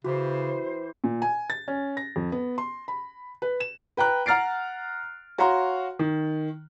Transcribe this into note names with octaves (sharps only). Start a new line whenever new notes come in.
C#3 E3 F#4 G4 C5
A#2
G#5
A6
C#4
A#6
F2
B3
C6
B5
B4
E7
B4 G5 A#5 F#6
F#5 A#5 F6 A6 C7 D7
F#4 C#5 F5 A#5 C6
D#3